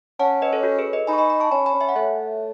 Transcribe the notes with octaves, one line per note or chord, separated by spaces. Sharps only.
C#4 F#5 A5
B4 D#5
A4 C#5
F#4 A4
G#4 B4
B4 D#5
D#4 G#5 B5
C#6
G#5 B5
G#5 B5
A5 C#6
C#4 G#5 B5
G#5 B5
C#4
E5 G#5
F#5
A3 C#5 E5